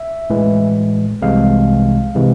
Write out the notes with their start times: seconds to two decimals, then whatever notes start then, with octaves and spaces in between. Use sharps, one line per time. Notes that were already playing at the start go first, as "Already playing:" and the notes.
Already playing: E5
0.30 A1 A2 E3 G#3
1.22 C2 C3 E3 G#3 F5
2.15 C3 E3 G#3